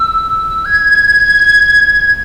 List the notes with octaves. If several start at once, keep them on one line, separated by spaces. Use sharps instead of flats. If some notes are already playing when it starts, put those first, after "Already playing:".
Already playing: E6
G#6